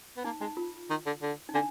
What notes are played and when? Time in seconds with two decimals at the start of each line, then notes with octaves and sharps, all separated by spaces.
0.17 B3
0.24 A#3 D#4
0.41 G#3 D#4
0.57 F4
0.90 D#3
1.06 D3
1.22 D3
1.49 D#4
1.54 D3 D4